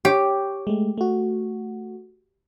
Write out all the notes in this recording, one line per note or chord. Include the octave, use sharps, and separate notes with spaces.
G4 C#5 G5
G#3 A3
A3 F#4